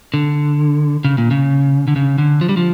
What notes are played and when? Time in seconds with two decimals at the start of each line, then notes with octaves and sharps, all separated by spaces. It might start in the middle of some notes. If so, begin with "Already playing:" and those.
0.14 D3
1.04 C#3
1.18 A#2
1.31 C#3
1.88 D3
1.96 C#3
2.18 D3
2.41 F3
2.49 G3
2.57 F3